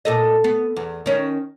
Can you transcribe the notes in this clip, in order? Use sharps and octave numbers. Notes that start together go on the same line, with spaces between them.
A#2 A4 D#5
B3
E2
D#3 C#4